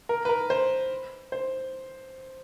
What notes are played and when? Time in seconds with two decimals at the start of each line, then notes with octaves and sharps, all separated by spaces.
0.09 A#4
0.25 B4
0.29 A#4
0.50 C5
1.32 C5